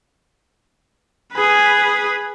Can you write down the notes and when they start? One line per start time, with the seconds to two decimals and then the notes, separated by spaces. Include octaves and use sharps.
1.33 G#4 B4